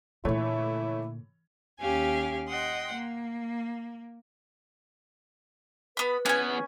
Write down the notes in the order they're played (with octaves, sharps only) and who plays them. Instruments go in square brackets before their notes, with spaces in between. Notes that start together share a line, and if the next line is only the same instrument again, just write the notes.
[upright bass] A#2 D3 [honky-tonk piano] E3 A3 C#5 [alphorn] E4
[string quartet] D#2 C#4 G4 F5 G#5
D#5 F#5 G5 C6
A#3
[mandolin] B3 B5 [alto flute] B4
[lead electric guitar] E2 B3 [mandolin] C#4 G#5